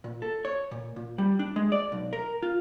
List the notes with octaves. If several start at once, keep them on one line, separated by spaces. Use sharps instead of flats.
A#2
A4
C#5
A#2
A#2
G3
D4
G#3
D5
B1
A#4
F4